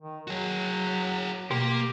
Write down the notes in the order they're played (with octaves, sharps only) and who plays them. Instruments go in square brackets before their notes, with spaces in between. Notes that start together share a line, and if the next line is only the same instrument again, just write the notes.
[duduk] D#3
[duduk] F#3 [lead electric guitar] F#4 G#4
[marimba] B2 [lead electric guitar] A#3 [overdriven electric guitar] G4